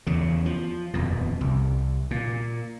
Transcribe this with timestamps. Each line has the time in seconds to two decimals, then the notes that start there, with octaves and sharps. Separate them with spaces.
0.07 E2 C#3
0.46 F3
0.94 D#1 F2 B2
1.41 C2
2.11 A#2